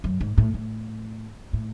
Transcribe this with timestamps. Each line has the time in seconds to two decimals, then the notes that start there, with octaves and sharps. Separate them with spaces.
0.04 F#2
0.21 G#2
0.38 A2
0.54 A2
1.53 A2